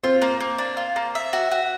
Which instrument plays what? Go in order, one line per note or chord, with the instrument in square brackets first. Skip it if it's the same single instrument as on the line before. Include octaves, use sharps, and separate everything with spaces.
[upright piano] C4 [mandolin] F4
[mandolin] A#3
A#3
D4
F4
A#3
E5
F#4
F#4